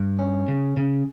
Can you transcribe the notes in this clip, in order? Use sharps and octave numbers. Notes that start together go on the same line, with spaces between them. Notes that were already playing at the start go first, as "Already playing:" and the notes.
Already playing: G2
C#4
C#3
C#3